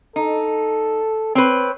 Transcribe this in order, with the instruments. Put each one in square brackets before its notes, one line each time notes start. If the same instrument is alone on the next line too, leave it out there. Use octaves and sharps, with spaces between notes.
[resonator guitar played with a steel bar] D#4 [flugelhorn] A4
[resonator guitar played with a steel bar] C4 B4 [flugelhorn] C#5